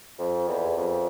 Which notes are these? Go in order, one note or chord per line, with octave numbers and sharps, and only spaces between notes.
F2
E2
F2